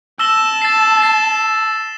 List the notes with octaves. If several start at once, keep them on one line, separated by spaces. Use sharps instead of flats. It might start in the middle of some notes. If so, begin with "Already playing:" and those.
A5 E6 A#6 E7 G7
A6 C7 E7
A6 C7 E7